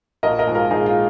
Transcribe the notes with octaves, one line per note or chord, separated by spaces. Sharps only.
A#1 A#4 D#5
A#4 D#5
G#2 F3 G#3
F4 A#4
A#1 D#4 G#4
F4